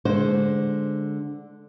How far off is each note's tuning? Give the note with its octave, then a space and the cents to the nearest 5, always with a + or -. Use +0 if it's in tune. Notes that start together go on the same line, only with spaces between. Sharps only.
D3 +0 G#3 +5 C5 +0